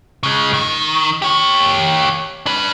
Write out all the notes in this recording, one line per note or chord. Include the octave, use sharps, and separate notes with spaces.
C#3 G#3
D#3
G4 C#5
D4 B4